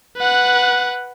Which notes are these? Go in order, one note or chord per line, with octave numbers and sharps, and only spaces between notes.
B4 F#5